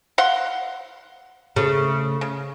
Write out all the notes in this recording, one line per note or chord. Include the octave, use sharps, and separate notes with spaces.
F5 F#5 C6
C#3 A3
C#3